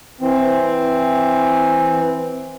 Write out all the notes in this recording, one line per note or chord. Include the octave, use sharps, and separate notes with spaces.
E3 C4